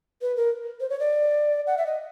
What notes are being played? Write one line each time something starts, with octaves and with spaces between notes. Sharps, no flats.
B4
A#4
C5
C#5
D5
F#5
E5
D#5